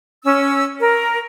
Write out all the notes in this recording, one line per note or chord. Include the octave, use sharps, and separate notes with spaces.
C#4 E6
A#4